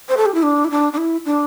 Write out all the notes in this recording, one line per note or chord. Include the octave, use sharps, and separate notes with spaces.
C5
A4
G4
E4
D4
E4
D4
D4
E4
D4